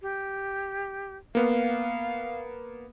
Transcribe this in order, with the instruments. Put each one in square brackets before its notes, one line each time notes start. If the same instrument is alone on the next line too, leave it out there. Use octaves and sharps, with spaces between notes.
[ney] G4
[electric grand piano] A#3 B3 [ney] F5